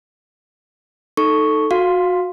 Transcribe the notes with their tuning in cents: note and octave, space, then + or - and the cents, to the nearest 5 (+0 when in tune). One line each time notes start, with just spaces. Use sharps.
D#4 +0 A4 +0 C#6 +0
F#4 -25 F5 +0 C6 +0